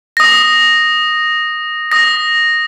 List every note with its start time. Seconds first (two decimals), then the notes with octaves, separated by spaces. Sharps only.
0.17 D#6 A#6
1.92 D#6 A#6